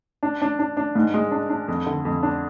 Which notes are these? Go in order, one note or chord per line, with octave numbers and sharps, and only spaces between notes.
D4
D4
D4
D4
G#2
G#3
D4
D4
F2
D3
F2
D4